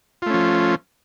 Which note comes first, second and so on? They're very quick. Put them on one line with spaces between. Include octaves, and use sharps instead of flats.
F4 A3 C#4 F3